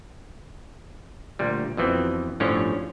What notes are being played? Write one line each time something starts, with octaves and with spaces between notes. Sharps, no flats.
D2 A#2 G3
F2 B2 E3 C4
G1 A2 D3 F3 C#4 C#5